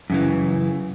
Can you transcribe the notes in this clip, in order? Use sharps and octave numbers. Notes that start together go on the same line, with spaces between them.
F#2 C#3 E3